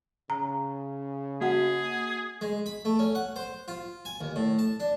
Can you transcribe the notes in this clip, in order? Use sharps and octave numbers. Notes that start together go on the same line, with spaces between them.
C#3 A#5
A#3 F#4 G#4 F#5
G#3
B5
A3
C#4
F#5
C5
F4
G#5
D#2
A2
A5
D4